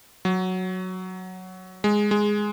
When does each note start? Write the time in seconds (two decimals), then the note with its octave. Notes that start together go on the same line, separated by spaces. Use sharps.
0.25 F#3
1.84 G#3
2.11 G#3